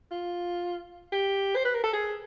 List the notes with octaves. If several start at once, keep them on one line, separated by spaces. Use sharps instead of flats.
F4
G4
C5
B4
A#4
A4
G#4